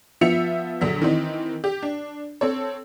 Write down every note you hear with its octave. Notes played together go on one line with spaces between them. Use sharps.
F3 B3 E5 C#7 F7
A#1 D3 F#3 B6
D#3 E3 C4 D#4
G4
D4
C4 A4 C#5